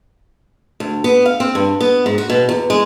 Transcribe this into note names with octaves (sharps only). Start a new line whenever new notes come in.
D2
B3
F5
C4
G2
B3
G#2
F#4
B2
E2
G#3